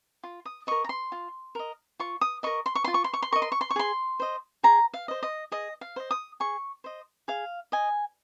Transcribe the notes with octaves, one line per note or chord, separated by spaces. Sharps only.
F4
D#6
A#4 D#5 C#6
A#5
C6
F4
A#4 D#5
F4 C#6
D#6
A#4 D#5 C#6
C6
C#6
F4 C6
C#6
C6
C#6
C6
A#4 D#5 C#6
C6
C#6
C6
C#6
G#4 C6
C5 D#5
G#4 A#5
F5
C5 D#5
D#5
G#4 D#5
F5
C5 D#5
D#6
G#4 C#6
C5 D#5
G#4 F5
D#5 G#5